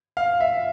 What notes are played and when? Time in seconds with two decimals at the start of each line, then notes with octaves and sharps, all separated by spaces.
0.17 F5
0.40 E5